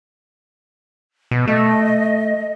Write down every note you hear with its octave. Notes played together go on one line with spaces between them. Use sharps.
B2
A3 D#5